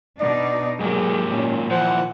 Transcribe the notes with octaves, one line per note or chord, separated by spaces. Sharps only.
B2 D4 D#4 D5
G#2 F#3 A#3 G4 G#4
A#2 C#4
E3 F3 C5 F#5